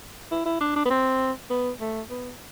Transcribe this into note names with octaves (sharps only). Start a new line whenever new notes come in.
E4
E4
D4
D4
B3
C4
B3
A3
B3